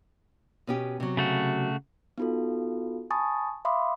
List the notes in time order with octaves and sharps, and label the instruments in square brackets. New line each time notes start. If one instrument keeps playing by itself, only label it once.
[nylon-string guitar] B2 C#4 G4
C3 F#3
[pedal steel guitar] C#3 A3 F#4
[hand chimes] B3 D#4 F4 F#4 A4
G#5 A5 B5 C#6 D#6 A6
E5 F5 B5 C6 D6 D#6